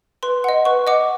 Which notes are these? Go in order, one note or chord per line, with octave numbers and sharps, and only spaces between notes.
B4 C6
D#5 F#5
B4 C#6
D#5 F#5 D6